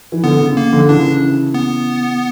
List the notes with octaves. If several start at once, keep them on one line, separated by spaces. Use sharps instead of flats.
E3
D3 B3
C#3
A#3
D3
C#3 E3 D4
B3